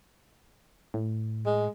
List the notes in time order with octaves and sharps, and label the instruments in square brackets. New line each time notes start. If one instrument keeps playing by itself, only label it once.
[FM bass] A2
[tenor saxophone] G#3